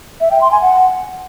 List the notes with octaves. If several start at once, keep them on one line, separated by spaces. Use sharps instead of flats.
E5
G5
C6
G#5
F#5